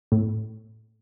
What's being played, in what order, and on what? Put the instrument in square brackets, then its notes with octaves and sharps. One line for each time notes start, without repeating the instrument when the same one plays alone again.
[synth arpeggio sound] A2